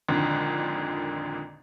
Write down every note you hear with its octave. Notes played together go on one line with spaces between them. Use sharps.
G#1 F2 A#2 D3 D#3